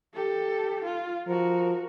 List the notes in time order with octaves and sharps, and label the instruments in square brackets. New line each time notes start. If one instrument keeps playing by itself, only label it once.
[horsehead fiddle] G4 A4
F4
[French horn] F3 [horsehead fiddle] F#4 A#4